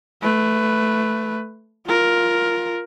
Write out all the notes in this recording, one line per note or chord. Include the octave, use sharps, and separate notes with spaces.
A3 B4
F4 A#4